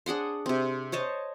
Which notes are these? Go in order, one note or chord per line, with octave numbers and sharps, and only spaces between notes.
D4 G#4 F#5 C6
C3 C4
C5 C#5 D#5 A5